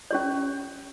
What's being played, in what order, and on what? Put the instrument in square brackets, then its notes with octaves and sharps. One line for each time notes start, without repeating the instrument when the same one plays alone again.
[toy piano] C#4 G4 C#5